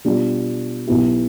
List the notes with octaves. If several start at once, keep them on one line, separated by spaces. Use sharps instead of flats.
B2 G3 D4 F4
B1 B2 B3 E4 G4